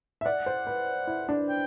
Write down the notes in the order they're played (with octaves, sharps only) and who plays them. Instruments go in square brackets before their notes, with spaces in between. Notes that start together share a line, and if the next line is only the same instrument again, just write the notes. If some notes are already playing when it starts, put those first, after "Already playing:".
[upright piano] E5
[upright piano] D5 [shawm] F#5
[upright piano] C5
B4
E4
D4
[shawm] G5